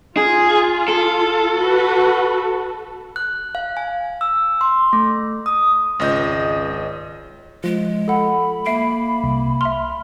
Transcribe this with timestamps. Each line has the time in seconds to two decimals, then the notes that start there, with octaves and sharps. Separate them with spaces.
0.17 F4 G#4
0.88 A4
1.55 F#4 B4
3.16 F#6
3.55 F5
3.77 G#5
4.21 E6
4.61 C6
4.93 A3
5.46 D#6
6.00 G#1 C#2 D#5 G6
7.64 F3 G#3
8.08 A4 F#5 B5
8.66 A#3 E5 C7 D7
9.24 C2
9.61 E5 C6 F6